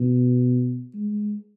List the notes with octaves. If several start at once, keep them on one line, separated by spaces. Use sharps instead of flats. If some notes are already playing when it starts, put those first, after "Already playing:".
Already playing: B2
G#3